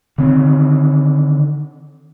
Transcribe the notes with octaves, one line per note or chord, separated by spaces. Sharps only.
D3 D#3 C4